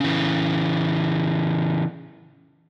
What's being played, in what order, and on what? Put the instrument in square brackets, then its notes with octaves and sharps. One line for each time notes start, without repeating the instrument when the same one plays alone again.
[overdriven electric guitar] C#3 E3